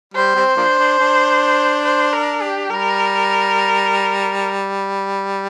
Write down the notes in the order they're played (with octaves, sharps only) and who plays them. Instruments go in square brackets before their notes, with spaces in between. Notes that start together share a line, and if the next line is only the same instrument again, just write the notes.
[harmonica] G3 [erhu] C5
[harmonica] G3 C4
F3 A#3 D4
D4
D4
[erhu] C5
A#4
G4
[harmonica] G3 [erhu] A#4